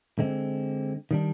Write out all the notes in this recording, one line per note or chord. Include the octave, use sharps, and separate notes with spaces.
D3 G#3 C4
D#3 G3 D4